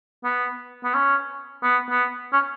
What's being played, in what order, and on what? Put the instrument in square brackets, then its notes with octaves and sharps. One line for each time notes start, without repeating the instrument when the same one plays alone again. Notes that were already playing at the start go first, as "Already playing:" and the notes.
[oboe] B3
B3
C#4
B3
B3
C#4